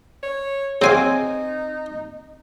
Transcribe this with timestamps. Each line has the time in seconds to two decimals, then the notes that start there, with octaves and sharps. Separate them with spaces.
0.23 C#5
0.81 C#3 C4 D#4 F5 G#5 D6